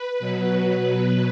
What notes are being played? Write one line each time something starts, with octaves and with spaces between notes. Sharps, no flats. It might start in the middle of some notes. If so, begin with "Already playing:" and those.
Already playing: B4
B2 F#3
B2 F#3 B4